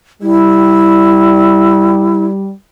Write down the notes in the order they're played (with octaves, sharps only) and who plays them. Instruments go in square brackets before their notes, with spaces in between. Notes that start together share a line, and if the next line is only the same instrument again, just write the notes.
[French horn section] G3 [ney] E4